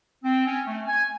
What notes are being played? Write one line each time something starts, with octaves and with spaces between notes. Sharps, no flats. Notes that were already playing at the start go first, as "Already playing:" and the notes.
C4
C#4
A3
G#5